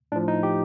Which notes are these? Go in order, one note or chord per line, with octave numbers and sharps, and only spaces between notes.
A2 F3 D4
D#4
G4